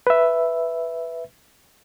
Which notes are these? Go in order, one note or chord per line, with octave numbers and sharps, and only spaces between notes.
B4 E5